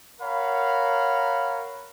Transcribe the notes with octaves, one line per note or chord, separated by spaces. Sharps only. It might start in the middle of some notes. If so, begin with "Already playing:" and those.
A#4 C#5 F5 F#5 A#5 B5